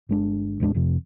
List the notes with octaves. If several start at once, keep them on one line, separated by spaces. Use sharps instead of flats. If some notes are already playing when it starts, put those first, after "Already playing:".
G1 G#3 D4
A1 E2 G#3 D4
F1 F2 C3